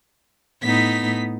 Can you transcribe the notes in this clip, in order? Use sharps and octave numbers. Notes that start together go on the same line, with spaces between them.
A2 B3 D#4 B6